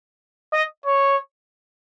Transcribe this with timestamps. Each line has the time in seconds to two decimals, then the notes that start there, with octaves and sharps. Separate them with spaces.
0.53 D#5
0.86 C#5